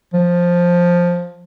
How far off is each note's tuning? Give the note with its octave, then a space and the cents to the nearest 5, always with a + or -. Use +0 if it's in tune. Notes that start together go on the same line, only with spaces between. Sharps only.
F3 +10